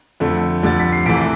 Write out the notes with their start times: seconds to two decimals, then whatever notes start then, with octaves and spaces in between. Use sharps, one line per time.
0.20 F2 D3 A3
0.63 F2 D3 G3 A6
0.80 B6
0.92 C7
1.06 C2 C3 E3 A3 B6 D7